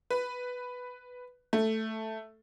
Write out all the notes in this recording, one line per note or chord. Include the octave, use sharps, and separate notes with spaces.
B4
A3